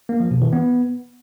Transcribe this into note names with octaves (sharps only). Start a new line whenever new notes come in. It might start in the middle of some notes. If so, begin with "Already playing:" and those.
A#3
F3
B2
E3
B3